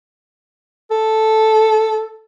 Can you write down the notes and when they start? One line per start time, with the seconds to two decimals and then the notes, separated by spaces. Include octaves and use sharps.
0.91 A4